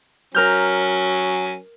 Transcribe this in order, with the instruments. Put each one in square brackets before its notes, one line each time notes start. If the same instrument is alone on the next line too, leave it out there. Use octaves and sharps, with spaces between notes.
[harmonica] F#3 C#4 [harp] A#4 F6 G6